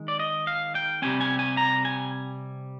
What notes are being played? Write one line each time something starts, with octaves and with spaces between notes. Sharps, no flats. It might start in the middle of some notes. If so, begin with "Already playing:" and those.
Already playing: D#3 G#3
D5
D#5
F5
G5
C3 D#3 G3 C4 G#5
G#5
G#5
A#5
G#5